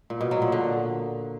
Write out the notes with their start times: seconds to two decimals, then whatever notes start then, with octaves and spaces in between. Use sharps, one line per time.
0.10 A#2
0.21 B2
0.31 F#3
0.42 A#2
0.52 D3